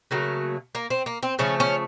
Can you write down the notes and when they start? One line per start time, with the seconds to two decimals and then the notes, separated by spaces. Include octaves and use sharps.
0.11 C#3 F#3 A3 A#3
0.75 A#3
0.90 C4
1.06 A#3
1.23 C4
1.39 C#3 F3 A3 C#4
1.60 C#4